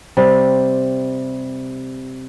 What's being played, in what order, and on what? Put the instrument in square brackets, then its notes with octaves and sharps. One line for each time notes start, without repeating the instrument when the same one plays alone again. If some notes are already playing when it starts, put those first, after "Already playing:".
[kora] C3 G3